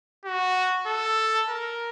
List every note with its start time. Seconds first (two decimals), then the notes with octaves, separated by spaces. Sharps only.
0.25 F#4
0.87 A4
1.49 A#4